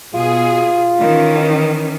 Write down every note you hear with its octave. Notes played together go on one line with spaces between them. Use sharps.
B2 F4 G#4
D#3 E3 C#4